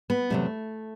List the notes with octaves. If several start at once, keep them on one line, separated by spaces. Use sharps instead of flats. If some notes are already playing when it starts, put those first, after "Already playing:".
B3
E2 C3 F#3 A3